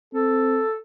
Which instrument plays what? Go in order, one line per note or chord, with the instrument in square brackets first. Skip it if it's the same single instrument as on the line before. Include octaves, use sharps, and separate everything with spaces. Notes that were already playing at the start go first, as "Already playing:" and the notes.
[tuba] C4 [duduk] A4